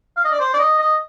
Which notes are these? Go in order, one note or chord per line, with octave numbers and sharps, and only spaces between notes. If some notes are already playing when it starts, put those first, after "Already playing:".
F5
D#5
D5
C5
D5
D#5
D#5